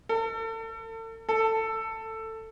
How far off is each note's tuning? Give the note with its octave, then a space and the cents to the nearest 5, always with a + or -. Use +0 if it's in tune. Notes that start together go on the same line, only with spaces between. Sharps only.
A4 +40
A4 +15